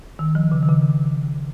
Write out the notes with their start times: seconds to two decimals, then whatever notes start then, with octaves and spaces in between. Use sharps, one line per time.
0.19 D#3
0.35 F3
0.52 C#3
0.63 D#3
0.69 C#3